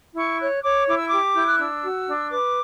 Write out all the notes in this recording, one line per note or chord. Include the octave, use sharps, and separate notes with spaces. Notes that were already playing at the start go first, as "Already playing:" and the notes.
E4 C#6
C#5 F#6
C#5 D6
E4 D6
E6
G4 D6
E4 G6
F#6
D4 E6
F#4
D4
B4 D6